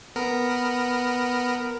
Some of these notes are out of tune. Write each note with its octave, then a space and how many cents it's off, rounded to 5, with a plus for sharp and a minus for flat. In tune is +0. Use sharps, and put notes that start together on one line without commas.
B3 +0 A#4 +0